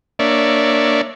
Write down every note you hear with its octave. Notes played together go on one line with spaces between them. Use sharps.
A#3 D4 C#5 D5 E5